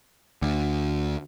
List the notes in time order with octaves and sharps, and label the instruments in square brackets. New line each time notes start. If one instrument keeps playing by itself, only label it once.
[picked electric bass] D2